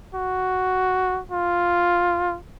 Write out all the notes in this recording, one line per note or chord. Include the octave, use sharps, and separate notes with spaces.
F#4
F4